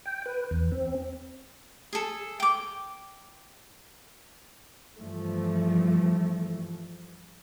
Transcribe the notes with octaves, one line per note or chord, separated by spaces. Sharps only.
G5
B4
E2
C4
G#4 A4
G5 D6
G2 E3 F3 A3